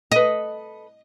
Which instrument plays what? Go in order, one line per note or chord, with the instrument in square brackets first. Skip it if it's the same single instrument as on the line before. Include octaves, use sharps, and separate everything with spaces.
[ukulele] A4 B4 [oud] D#5